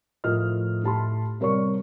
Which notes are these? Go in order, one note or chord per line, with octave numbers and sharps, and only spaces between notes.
A2 F3 A#4 D#5 F6
A2 G4 A5 B5 C6
C3 G3 A#4 C#5 D5 C#6